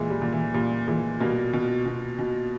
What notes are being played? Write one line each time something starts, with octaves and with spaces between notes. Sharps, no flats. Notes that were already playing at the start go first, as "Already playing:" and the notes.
Already playing: A#2 E3 G#3
G3
A#2
E3
A#2 G3
A#2 E3 G#3
B2 G3 A#3
B2
B2
B2